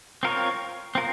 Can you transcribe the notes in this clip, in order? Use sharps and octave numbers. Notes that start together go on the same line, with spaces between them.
C4 F4 A#4 C#5
C4 F4 A#4